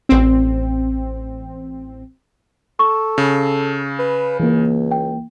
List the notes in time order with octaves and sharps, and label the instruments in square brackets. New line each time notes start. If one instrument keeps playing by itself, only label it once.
[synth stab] A1 C4
[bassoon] A4 [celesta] C#6
[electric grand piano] C#3
[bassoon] B4
[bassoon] C#2 [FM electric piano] E3 A#3
[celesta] G5